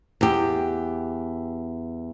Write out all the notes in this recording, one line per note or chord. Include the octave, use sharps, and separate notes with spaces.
E2 G4